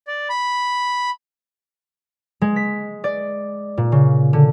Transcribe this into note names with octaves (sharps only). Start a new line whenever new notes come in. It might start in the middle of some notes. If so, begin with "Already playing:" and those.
D5
B5
G#3
B6
D5
A#2
C#3
D3